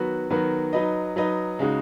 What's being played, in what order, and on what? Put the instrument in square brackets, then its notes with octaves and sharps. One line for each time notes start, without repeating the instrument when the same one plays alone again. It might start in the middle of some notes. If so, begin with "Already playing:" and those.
Already playing: [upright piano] D#3 F#3 B3 F#4 B4
D#3 F#3 B3 F#4 B4
F#3 D#4 B4 D#5
F#3 D#4 B4 D#5
C#3 G#3 D#4 F#4